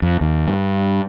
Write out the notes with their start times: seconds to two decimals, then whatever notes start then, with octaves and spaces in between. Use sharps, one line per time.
0.02 F2
0.21 D#2
0.48 G2